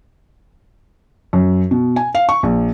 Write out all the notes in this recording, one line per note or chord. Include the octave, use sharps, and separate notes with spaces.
F#2
B2
G#5
F5
C#6
A#1